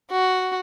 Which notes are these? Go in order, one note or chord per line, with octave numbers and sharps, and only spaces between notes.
F#4